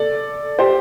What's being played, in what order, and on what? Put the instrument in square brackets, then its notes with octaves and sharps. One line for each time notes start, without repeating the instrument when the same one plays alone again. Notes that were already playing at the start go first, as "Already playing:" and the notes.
Already playing: [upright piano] A4 D5
G4 C5